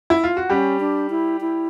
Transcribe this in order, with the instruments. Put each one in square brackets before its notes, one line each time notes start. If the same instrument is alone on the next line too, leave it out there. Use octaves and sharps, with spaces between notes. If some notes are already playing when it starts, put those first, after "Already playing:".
[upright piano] E4
F4
F#4
[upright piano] G3 G4 [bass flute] C#4
[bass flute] D4
E4
E4